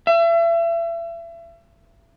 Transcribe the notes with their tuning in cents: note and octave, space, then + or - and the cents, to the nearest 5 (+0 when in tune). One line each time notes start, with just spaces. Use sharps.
E5 +35